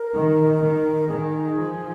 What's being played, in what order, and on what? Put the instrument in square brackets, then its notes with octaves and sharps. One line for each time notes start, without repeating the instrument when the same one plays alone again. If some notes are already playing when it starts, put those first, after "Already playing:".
Already playing: [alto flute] A#4
[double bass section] D#3
D#3
[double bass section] D#3 [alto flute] G#4
[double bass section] F3